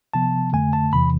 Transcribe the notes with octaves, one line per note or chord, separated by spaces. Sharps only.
C3 F3 B3 A5
F2 D3 A3 G#5
A5
E2 C3 E3 B5